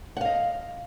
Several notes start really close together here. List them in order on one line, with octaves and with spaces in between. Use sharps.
F#5 F5 D#5